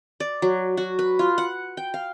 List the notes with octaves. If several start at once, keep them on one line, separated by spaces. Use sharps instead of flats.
D5
F#3
F#4
B4
F4
F#5
G5
F5